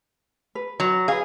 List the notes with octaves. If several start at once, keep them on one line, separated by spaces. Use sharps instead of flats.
B4
F#3
G#4 B4 F5